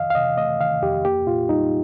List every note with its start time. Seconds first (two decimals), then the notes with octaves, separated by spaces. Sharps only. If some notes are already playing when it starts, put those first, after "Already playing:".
Already playing: F2 D#3 D#5 F5
0.10 F5
0.15 C3 D#5
0.37 A3 D#5
0.59 D#3 F5
0.82 F2 G4
1.04 A#3 G4
1.26 A#2 F4
1.49 G3 D#4